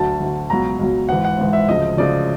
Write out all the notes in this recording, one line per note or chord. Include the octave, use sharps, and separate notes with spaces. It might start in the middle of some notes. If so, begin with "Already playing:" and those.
Already playing: D2 D3 F#3 A5
D2 D3 F#3
C#2 B2 F#3 A#5
C#2 B2 F#3
G#1 G#2 E3 F#5
F#5
G#1 G#2 E3
E5
D2 C#3 F3 D#5
D2 C#3 F3 D5